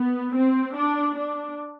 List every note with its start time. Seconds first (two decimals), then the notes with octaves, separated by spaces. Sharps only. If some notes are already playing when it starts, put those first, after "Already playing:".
Already playing: B3
0.35 C4
0.75 D4
1.15 D4